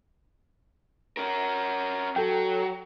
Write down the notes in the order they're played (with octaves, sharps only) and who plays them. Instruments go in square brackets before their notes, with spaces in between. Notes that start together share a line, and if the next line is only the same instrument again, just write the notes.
[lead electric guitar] C#4 A#4
[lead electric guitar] F#3 [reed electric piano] A4 G5